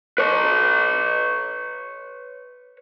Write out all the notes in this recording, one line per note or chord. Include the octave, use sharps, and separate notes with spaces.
B4 C#5